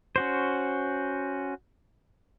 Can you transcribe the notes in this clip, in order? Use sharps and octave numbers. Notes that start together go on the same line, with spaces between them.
C#4 F#4 C5